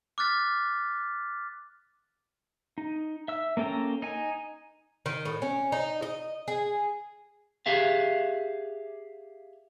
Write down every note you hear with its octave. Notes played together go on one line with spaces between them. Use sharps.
D6 F6 F#6 A6 B6
D#4
E5 E6
A#3 C#4 A4 G5 A#5
D#4 G#5
D#3
A2
C#4
D#4
D#5
G#4
G4 G#4 E5 F5